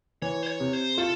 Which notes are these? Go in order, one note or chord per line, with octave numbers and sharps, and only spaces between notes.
E3 C#5
C5
C#5
C3
C5
F4 A4